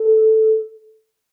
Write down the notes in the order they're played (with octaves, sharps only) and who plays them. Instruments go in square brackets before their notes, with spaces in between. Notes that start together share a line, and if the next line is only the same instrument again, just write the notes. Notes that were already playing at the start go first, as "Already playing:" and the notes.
Already playing: [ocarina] A4